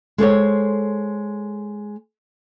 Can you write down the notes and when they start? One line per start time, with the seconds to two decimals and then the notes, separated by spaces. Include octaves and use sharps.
0.18 G#3 A4 C5 C#5